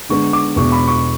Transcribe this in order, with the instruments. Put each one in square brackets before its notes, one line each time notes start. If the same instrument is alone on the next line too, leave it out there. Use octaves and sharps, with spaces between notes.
[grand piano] D3 G#3 B3 D4 C#6
D6
E2 B2 G#3 D4 C#6
B5
C#6